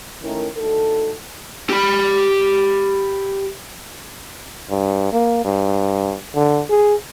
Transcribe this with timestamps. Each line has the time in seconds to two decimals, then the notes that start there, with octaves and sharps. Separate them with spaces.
0.21 D#3 A3 C#4 E4 A#4
0.57 D2 D#4 A4
1.70 G4 B5
4.70 G2
5.12 A#3
5.45 G2
6.35 D3
6.70 G#4